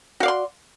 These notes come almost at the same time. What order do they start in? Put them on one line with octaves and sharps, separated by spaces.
F#4 F5 D5 C6